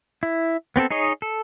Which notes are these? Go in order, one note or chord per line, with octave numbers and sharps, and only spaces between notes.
E4
B3 C4 G4 A4
D#4 G#4 C#5 D#5
A4